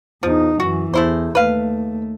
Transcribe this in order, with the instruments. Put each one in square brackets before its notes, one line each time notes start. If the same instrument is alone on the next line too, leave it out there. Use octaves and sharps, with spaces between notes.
[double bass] E2 D#4 [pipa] F3
[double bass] F#2 E3 [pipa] F#4
[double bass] E2 [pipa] A3 E4 C5
[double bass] D#2 A3 [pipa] B4 F5